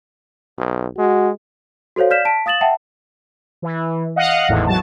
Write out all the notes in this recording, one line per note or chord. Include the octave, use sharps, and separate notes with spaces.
B1
G#3 F#4
F#4 A4 C5 C#5 F5
D5 F5 F6 G6 B6 E7
A5 B6 D7
F5 D#6 A6 E7 F#7
E5 F#5 G5 A5
E3
D#5 F5 F#5
G#1 E2 A2
F#3 A5